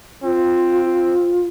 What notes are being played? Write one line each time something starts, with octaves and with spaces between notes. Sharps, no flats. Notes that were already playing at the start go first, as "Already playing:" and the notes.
C4 F4